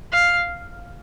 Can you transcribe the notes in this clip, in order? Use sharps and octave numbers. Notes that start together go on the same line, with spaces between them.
F5